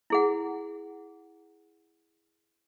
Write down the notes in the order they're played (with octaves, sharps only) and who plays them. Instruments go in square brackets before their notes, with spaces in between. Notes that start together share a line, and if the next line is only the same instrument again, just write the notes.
[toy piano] E4 G#4 F#5